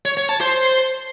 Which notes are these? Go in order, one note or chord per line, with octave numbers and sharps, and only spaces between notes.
C#5
C#5
A5
C5